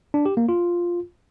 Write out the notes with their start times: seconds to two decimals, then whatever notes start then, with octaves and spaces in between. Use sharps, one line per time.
0.14 D4
0.26 G4
0.37 A#3
0.49 F4